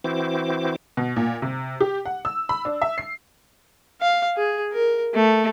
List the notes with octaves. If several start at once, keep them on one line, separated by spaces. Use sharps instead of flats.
E3 C4 E4 F#4 C5 D6
B2
A#2
C3
G4
F#5
E6
B5
D4
E5
C7
F5
G#4
A#4
A3